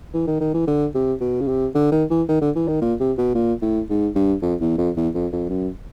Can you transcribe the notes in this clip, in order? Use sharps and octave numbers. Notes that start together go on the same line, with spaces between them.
E3
D#3
D#3
E3
D3
C3
B2
C#3
C3
D3
D#3
E3
D#3
D3
E3
D#3
A#2
C3
B2
A#2
A2
G#2
G2
F2
E2
F2
E2
F2
F2
F#2